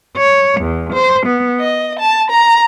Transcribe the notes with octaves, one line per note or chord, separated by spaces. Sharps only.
C#5
E2
C5
B3
D#5
A5
A#5